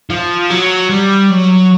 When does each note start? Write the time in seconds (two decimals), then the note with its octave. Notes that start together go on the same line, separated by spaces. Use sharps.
0.10 F3
0.50 F#3
0.90 G3
1.30 F#3